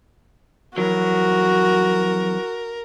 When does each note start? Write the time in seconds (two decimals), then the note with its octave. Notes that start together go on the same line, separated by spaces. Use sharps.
0.78 F2 E3 F#3 F#4 A#4